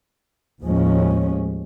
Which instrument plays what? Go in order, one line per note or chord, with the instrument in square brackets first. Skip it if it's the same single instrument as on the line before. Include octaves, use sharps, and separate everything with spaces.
[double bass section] D#2 A2 F3 G#3 C#4